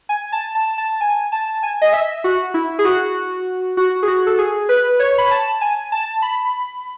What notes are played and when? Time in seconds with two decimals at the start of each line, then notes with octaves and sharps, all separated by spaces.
0.09 G#5
0.32 A5
0.55 A5
0.78 A5
1.01 G#5
1.32 A5
1.63 G#5
1.82 D#5
1.93 E5
2.24 F#4
2.54 E4
2.79 G#4
2.85 F#4
3.77 F#4
4.03 G#4
4.08 F#4
4.26 A4
4.38 G#4
4.69 B4
4.99 C#5
5.18 B5
5.31 A5
5.61 G#5
5.92 A5
6.22 B5